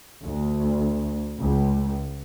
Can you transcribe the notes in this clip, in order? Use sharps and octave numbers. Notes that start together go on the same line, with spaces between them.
D2
C#2